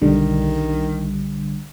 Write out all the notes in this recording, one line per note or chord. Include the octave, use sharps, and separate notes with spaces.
B1 D3 D#3 G3